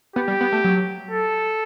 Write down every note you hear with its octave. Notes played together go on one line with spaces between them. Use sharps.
B3 G4
G3
B3
A3
F#3
A4